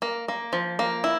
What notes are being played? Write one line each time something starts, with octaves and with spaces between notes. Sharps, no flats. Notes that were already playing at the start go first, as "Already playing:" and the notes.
A#3
A#3
F3
A#3
E4